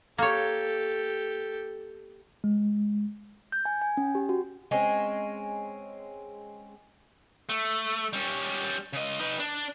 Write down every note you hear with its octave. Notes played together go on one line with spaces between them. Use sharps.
A#3 G4 A4 C#5
G#3
G6
G#5
G#5
C#4
G4
F#4
G#3 C4 C#4
A3
G3 C#4
C#3 D#5
D#4 B4
D4